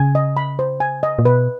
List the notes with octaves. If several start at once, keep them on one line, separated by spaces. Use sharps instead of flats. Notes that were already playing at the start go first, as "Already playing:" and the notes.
Already playing: C#3 G#5
D#5
B5
C5
G#5
D#5
A#2
B2 B4